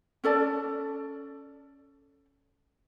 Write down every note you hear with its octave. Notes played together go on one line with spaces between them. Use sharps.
C#4 A4 D5 A5